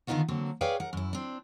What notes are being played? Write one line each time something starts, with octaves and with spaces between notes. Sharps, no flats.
D3 D#3 B3 D#4 F4 F#4
D3 F#3 A#3 C4
G#4 B4 C#5 D5 F5 G5
A#4 F#5
F#2 E4
C4 D4